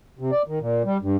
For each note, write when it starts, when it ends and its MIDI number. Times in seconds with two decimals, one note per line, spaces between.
0.19 0.31 48
0.32 0.42 74
0.47 0.59 51
0.61 0.83 46
0.85 0.98 55
1.02 1.17 43